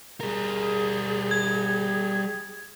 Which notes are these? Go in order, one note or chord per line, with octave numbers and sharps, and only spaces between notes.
G3 G#4 A#4
G#6